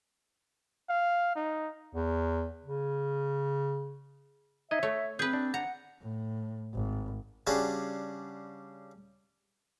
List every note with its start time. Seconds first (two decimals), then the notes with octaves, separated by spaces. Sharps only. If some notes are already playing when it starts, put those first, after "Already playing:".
0.89 F5
1.36 D#4
1.94 E2
2.63 C#3
4.71 D#4 D#5 E5 G#6
4.83 A3 C#5
5.19 C4 G#4 B4 G6
5.33 D4
5.54 F#5 A#5
6.01 A2
6.74 G#1
7.47 C#3 G3 D4 F#4 G#4